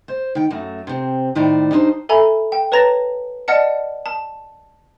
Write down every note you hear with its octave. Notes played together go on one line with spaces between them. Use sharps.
C5
D#3 G5
F#2 F#3 A3
C3 C4
A2 D#3 A3 C5 D5 A#5
G3 D4 D#4 C5
A4 E5 G#5 A#5 B5
G5
B4 C#5 A5 A#5 A6 A#6
D5 D#5 F#5 A5 F6 C#7
A5